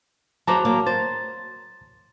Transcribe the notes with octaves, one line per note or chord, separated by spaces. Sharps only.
F#3 G#4 C5 A5 A#5 D6
F#3 A#3
C5 A6